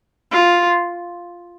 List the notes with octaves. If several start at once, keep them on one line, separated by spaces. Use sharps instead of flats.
F4